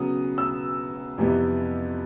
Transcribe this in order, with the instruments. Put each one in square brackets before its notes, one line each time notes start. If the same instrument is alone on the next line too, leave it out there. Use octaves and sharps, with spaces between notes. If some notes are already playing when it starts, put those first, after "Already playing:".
Already playing: [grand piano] C#3 F#3 B3 D#6
E6
F2 C3 E3 G3 B3